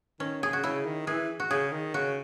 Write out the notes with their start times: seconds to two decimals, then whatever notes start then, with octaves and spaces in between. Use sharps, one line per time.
0.20 D#3 C#4
0.42 C#3 G#4
0.53 F#4
0.63 C#3 E4
0.85 D#3
1.07 E3 G#4
1.40 F#4
1.50 C#3 G#4
1.72 D#3
1.94 C#3 F#4